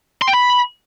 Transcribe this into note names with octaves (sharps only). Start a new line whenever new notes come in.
C6
G5
B5